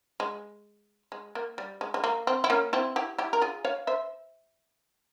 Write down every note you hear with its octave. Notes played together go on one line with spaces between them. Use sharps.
G#3
G#3
A#3
G3
G#3
G#3
A#3
C4
E4
A#3 C#4
C4 E4
E4 G4
E4 G4
A#4
F4 G#4
C#5 F5
C5 E5